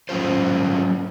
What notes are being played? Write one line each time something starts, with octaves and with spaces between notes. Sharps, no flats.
G#2 F#3 C#4 F4 C5